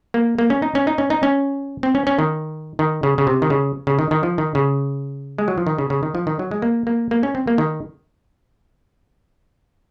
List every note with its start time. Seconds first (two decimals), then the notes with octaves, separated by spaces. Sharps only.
0.14 A#3
0.39 A#3
0.50 C#4
0.62 D#4
0.75 C#4
0.87 D#4
0.98 C#4
1.10 D#4
1.23 C#4
1.83 C4
1.95 C#4
2.07 C#4
2.19 D#3
2.79 D#3
3.03 C#3
3.18 C#3
3.27 C3
3.42 D#3
3.50 C#3
3.87 C#3
3.99 D#3
4.11 D#3
4.23 F3
4.38 D#3
4.55 C#3
5.38 G#3
5.48 F#3
5.58 F3
5.67 D#3
5.78 C#3
5.90 C#3
6.03 D#3
6.15 F3
6.27 D#3
6.39 F#3
6.51 G#3
6.62 A#3
6.87 A#3
7.11 A#3
7.23 C#4
7.35 C4
7.47 A#3
7.58 D#3